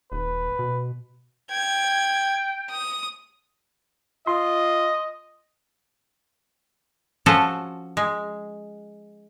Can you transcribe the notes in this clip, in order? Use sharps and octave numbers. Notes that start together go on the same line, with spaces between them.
D#1 B4
B2
G5 G#6
D#6
F4 D#5 C6
F3 C#4 F#4 A4 C5
G#3